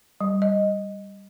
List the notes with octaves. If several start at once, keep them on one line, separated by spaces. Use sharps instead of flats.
G3
D#5